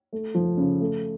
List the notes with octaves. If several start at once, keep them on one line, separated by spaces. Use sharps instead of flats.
A3
F3
C#3
A3